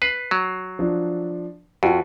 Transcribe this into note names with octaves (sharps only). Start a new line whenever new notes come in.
B4 C7
F#3
F3 D4
F2 F4 F#4